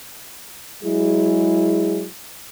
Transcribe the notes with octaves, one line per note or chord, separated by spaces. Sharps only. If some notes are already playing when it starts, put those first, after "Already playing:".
F#3 G#3 E4 G#4